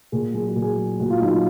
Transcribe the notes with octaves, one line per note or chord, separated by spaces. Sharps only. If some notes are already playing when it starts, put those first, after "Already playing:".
A#2 G#4
F#3 G#4
F#4
A#2
G#4
F#3
A#2 F#4
F4
F#3 D#4
F4